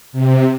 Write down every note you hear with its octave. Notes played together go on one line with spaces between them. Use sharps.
C3